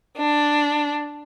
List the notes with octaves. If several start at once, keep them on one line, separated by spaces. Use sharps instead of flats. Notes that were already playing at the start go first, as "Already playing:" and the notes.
D4